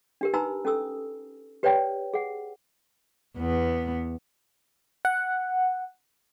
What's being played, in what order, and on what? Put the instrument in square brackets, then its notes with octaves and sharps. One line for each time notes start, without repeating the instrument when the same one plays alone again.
[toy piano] D4 G4 A#4
D#4 B4 G#5 A#5 B5 E6
C#4 A4 D#6 E6
G4 B4 C#5 D5 G5
G#4 F#5
[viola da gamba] E2 B3
[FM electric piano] F#5